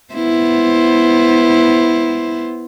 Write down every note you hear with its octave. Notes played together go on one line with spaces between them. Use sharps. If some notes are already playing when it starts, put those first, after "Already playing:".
B3 E4 C5